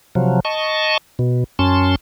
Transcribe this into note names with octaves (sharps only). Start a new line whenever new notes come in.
C3 F3 F#3
D#5 A5 C#6
B2
F#2 C#4 A5 C6